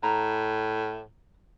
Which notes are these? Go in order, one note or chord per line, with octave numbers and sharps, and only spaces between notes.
A2 A#5